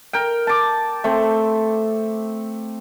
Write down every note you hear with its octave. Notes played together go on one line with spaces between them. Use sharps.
A#4 G5
A5 D6
A3 C4